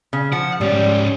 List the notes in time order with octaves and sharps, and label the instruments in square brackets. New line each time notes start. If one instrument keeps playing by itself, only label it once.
[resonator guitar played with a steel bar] C#3
[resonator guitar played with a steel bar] F3 [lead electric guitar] F#5
[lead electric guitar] G#2 C#4 [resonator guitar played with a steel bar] G3